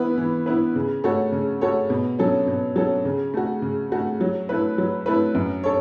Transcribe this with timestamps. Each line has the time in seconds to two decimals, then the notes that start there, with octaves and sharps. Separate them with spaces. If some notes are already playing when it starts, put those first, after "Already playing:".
Already playing: E3 B3 E4 B4
0.18 E3
0.46 B3 E4 B4
0.76 C#3
1.04 A3 F#4 A4 C#5
1.32 C#3
1.61 A3 F#4 A4 C#5
1.90 B2
2.19 F#3 C#4 A4
2.47 B2
2.76 F#3 C#4 A4
3.05 C#3
3.34 A3 F#4
3.62 C#3
3.92 A3 F#4
4.21 F#3
4.49 A3 E4 B4
4.78 F#3
5.06 A3 E4 B4
5.35 F#2
5.63 A4 C#5